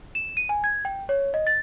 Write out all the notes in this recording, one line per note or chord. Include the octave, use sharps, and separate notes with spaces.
E7
D#7
G#5
G#6
G5
C#5
D#5
A6